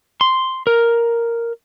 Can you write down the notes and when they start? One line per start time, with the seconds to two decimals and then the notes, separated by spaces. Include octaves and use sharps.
0.21 C6
0.67 A#4